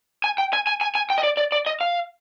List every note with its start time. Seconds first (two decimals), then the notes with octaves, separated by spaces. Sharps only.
0.24 G#5
0.38 G5
0.53 G#5
0.67 G#5
0.81 G#5
0.95 G#5
1.10 G5
1.18 D#5
1.23 D5
1.37 D5
1.52 D5
1.66 D#5
1.81 F5